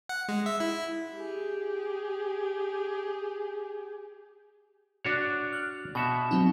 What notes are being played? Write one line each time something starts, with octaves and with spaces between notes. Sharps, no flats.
F#5
G#3
E5
E4
G4 G#4
D4 F#4 C#5
F6 F#6
B2 F#4 E5 G5
F#3 C4 D#4